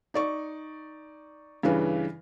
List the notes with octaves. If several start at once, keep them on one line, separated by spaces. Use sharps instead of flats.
D#4 D5 C#6
G2 C#3 E3 B4